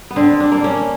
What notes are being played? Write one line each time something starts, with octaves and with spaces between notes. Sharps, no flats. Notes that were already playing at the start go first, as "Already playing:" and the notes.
B3
D3 C4
D4
A#3
C#4